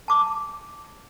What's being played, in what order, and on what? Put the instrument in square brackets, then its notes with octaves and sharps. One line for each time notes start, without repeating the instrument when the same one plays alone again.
[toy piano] A5 D6